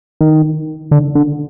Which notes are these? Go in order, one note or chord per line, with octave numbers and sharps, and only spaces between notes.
D#3
D3
D3